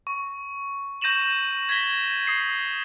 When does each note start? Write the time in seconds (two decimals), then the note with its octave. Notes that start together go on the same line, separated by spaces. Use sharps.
0.07 C#6
1.01 C#6 G6 A#6 D#7 E7 F#7
1.69 G#6 A#6 B6 G7
2.27 D#6 C7